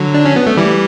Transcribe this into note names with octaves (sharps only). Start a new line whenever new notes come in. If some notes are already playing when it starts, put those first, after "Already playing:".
Already playing: D3 F#3
D4
C#4
B3
A3
E3 G3